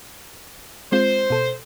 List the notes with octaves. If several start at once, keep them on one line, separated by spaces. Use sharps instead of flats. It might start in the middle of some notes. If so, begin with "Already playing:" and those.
G#3 C4 F4 C5
B2 A4